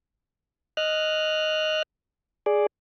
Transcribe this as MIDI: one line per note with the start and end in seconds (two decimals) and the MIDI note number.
0.77 1.83 75
0.77 1.83 89
0.77 1.83 90
2.46 2.66 68
2.46 2.66 74